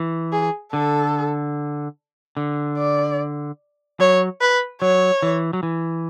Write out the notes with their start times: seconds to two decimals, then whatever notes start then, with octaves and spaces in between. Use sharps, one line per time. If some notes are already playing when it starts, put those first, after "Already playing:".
Already playing: E3
0.32 G#4
0.73 D3 A4
2.37 D3
2.78 D5
4.00 F#3 C#5
4.41 B4
4.81 F#3 C#5
5.22 E3
5.53 F#3
5.63 E3